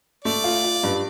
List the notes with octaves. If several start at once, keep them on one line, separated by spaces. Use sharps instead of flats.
A3 D5
F4
F4
G2